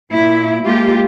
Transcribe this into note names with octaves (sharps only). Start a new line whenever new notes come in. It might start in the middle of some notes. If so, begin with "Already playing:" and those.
A#2 E4
G#3 A#3 F4 G4